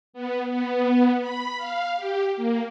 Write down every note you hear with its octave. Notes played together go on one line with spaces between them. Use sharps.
B3
B3
B5
F5
G4
A#3